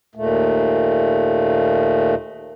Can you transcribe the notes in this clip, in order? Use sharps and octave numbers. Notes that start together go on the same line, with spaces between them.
D#2 A#2 A3